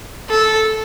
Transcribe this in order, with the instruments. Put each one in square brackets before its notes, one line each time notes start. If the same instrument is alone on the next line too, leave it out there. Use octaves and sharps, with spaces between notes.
[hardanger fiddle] A4